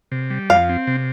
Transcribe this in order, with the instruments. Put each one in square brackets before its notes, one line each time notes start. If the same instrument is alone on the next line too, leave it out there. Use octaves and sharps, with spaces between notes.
[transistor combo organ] C3
G3
[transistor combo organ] F2 [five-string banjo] F5
[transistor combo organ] C4
C3